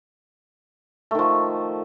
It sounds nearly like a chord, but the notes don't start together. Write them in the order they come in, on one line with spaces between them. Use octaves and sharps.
A3 D#3 F3